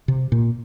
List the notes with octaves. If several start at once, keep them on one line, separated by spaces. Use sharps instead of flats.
C3
A#2